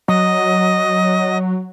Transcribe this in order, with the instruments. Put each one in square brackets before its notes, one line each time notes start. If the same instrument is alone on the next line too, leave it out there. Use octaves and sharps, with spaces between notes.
[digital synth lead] F#3 [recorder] D#5